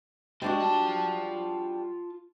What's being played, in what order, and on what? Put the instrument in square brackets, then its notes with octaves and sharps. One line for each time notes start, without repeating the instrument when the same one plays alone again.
[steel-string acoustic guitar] G3 D4 F#4 [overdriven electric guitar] G#3
[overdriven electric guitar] F4 A5